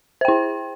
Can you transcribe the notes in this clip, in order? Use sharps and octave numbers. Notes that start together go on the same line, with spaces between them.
E4 C5 G5